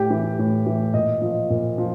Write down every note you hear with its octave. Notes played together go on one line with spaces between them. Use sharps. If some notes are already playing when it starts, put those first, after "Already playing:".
Already playing: A2 G4 G5
E3
A2
E3
A#2 D#5
F3 D#5
A#2
F3